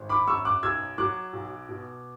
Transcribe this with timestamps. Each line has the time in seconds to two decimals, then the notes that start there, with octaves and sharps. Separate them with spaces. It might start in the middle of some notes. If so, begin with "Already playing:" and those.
Already playing: G#1
0.09 B5 D6
0.27 F#2 C#6 E6
0.45 D6 F#6
0.63 B1 E6 G#6
0.98 F#3 D6 F#6
1.33 B1
1.69 B2